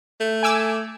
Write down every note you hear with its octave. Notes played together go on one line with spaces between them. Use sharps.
A3
G#5 D6 E6